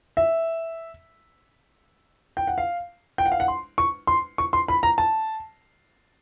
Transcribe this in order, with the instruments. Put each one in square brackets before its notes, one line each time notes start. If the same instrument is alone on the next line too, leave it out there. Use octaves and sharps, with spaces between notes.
[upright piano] E5
G5
F#5
F5
G5
F#5
F5
F#5
C6
C#6
C6
C#6
C6
B5
A#5
A5